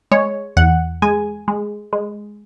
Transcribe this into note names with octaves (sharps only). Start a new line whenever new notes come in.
G#3 C#5
E2 F#5
G#3 G#5
G#3
G#3